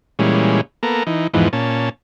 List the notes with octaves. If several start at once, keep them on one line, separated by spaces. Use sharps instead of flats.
A#2 E3 G3 G#3 C#4
A#3 B3 A4 A#5
E3 D#4
E2 G#2 E3 F3 B3 D#4
A#2 C#4 A5